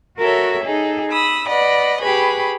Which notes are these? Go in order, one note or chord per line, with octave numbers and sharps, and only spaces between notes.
F#4 A4 A#4 C#5 E5
D#4 G#4 A4
B5 D#6 E6
B4 D5 D#5 F#5 B5
G4 G#4 B4 B5 C#6